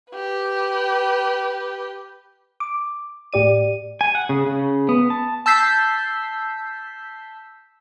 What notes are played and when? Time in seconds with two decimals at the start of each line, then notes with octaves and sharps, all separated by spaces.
0.13 G4 B4
2.60 D6
3.33 A2 G4 D5 D#7
4.01 G#5
4.15 F#5
4.29 C#3
4.46 C#3
4.89 B3
5.10 A5
5.46 A5 E6 G6 B6 C7